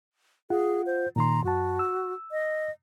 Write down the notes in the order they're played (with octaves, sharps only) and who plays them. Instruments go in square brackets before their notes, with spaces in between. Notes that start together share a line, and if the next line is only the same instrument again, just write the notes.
[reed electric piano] F4 F#5 [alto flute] G#4
[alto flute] C5
[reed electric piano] A#2 D#3 C6 [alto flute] A#5
[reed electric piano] F#2 A5 [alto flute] F#4
[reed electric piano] E6
[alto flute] D#5